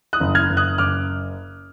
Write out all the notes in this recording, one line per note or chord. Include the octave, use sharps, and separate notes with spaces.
D#6 F#6
F#1
F6 G#6
F#1
D#6 F#6
F#1 D6 F6